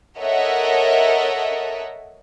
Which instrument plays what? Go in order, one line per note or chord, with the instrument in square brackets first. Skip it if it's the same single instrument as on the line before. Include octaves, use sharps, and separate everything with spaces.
[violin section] A4 A#4 C#5 D#5 E5 F#5